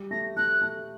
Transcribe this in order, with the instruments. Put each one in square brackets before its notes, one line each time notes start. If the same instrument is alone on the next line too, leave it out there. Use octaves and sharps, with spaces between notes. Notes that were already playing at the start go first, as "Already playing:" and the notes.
Already playing: [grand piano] G3
[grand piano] A3 [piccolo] A#6
[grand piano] A3 [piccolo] F#6
[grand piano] A3